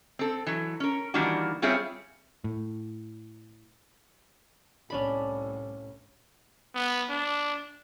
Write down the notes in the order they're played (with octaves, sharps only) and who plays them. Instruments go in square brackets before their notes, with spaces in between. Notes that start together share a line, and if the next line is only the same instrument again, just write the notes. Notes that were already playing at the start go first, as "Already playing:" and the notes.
[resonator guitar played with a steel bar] C4 A4
E3 F#3
C#4 A#4
D#3 E3 G3 A#3 D4 F#4
G3 C4 F4 G#4 C#5 E5
[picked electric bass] A2
[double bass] C2 A2 [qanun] C#4 D4 B5
[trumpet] B3
D4